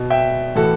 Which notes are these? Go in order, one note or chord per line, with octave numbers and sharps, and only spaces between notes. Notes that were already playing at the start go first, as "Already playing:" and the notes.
Already playing: B2
E5 G5
A2 E3 F#4 A4